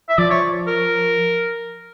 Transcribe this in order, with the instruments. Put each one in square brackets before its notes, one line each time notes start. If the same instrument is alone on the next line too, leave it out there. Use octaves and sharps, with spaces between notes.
[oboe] E5
[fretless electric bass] F3 [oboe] D5
[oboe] C#5
A#4